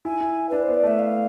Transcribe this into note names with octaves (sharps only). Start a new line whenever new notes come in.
E4 G#5
E4
D4 B4
C5
B3
D5
A3 E5
F5